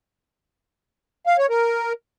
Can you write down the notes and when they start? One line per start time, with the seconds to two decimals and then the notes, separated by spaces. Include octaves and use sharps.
1.26 F5
1.38 C#5
1.50 A#4